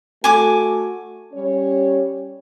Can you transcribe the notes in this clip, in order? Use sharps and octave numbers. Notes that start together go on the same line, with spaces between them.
A3 F#4 A4 G#5 D6
G3 C#4 C#5